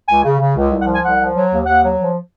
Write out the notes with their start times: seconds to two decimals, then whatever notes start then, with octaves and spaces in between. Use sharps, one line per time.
0.08 C#2 G#5
0.24 C#3
0.39 C#3
0.56 C#2
0.71 C2
0.82 F#5
0.87 F3
0.93 G#5
1.03 C2 F#5
1.19 F3
1.35 F#3
1.51 D#2
1.66 D#2 F#5
1.83 F#3
1.99 F3